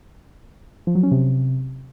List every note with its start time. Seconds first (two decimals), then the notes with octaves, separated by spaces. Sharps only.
0.87 F3
0.95 F#3
1.03 C#4
1.11 C3